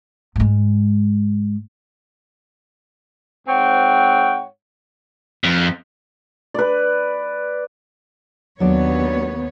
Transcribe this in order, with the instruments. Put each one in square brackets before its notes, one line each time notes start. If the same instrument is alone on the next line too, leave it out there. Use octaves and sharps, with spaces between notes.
[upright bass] G#2 G#3
[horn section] G#2 C4 C#5 F#5 G5
[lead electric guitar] F2
[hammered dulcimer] B4 D5
[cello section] D#2 B3 C#5 [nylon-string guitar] F#3 D4 D5